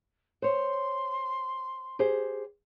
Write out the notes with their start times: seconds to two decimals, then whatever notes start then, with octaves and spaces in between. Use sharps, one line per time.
0.42 C5 C#5 C6
1.99 G4 G#4 C5